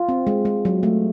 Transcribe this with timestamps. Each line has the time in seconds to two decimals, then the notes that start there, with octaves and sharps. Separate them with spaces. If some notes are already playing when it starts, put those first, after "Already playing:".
Already playing: F4
0.09 C4
0.27 G#3
0.45 G#3
0.65 F#3
0.83 A3